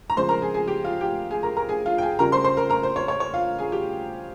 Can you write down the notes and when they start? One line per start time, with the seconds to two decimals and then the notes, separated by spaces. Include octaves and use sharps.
0.10 A#5
0.17 C#3 F3 G#3 C5 C6
0.29 A#4 A#5
0.42 G#4 G#5
0.54 G#4 G#5
0.68 G4 G5
0.84 F4 F5
1.01 G4 G5
1.31 G#4 G#5
1.43 A#4 A#5
1.57 A#4 A#5
1.69 G#4 G#5
1.86 F4 F5
1.98 G5
2.02 G#4 G#5
2.19 C#3 G3 A#4 A#5
2.32 C5 C6
2.44 C5 C6
2.57 A#4 A#5
2.70 A#4 A#5
2.83 C5
2.96 C#5
3.08 C#5
3.20 C#5
3.34 F4 F5
3.58 G#4 G#5
3.72 G4 G5